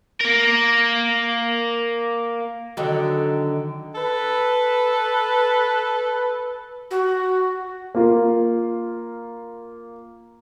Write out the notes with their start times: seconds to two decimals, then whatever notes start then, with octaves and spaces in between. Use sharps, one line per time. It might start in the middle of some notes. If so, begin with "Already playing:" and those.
0.21 A#3 A#4
2.77 D3 D#3 F#3
3.95 A4 B4
6.90 F#4
7.95 A#3 F4